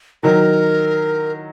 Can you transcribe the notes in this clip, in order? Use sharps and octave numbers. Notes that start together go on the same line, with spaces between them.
D#3 F#3 A#4